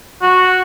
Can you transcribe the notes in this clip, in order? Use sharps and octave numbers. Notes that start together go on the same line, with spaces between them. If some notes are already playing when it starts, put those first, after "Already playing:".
F#4